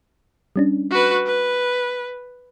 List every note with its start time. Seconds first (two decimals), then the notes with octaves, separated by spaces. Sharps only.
0.56 G3 C#4 D4
0.91 F#4 B4
1.26 B4